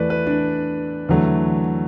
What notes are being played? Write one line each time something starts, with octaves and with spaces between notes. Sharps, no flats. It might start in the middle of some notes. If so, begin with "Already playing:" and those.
Already playing: E2 E3 A3 B4 D5
B4
D4
E2 D3 F#3 A3